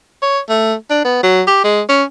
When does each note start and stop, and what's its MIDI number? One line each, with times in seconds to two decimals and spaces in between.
0.22 0.39 73
0.50 0.74 57
0.90 1.02 62
1.04 1.21 59
1.23 1.42 54
1.47 1.61 67
1.64 1.81 56
1.89 2.04 61